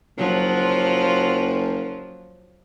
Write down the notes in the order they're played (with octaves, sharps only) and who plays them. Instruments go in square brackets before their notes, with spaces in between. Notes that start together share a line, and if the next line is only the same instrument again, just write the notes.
[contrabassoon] F#1 [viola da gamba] F3 F#3 F4